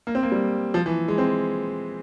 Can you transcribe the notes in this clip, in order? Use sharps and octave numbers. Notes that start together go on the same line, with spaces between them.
A#3
C4
A#3
G3
F3
E3
G#3
C4